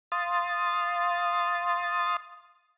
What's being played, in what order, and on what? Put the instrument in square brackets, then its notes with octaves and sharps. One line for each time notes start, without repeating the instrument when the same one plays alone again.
[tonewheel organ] F5 C6 D#6 A6